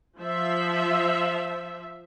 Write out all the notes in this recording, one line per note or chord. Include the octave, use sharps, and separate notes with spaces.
F3 E5